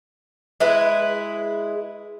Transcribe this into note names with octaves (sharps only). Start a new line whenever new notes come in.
G#3 E4 B4